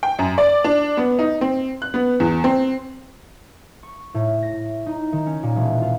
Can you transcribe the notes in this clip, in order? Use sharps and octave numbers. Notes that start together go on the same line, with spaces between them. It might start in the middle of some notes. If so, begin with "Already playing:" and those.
G5
F#2
D5
D4
B3
D#4
C4
F#6
B3
E2
C4
C#6
A2
A#6
D#4
D#3
C#4
A#2
E1
F4